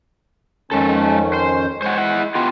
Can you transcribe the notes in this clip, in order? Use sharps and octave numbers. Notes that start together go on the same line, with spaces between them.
F2 D#3 G#3 C#4 A4
C5
G#3 C5 C#5 F#5
E4 F#5
B3 F4 G4